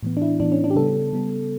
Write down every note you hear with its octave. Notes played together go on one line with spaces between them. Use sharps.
A2 E3 B3
D4
E4
A2 E3 B3 D4
C#4
D4
G4
C#3 G3 B3 A4
C#3 G3 B3